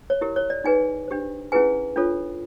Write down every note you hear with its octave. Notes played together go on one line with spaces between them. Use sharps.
C#5
E4 G4 A#4
C#5
D5
D#4 G#4 B4 G#5
D4 G4 C5
C#4 E4 G#4 B4 G#5
D4 F4 A4 C#5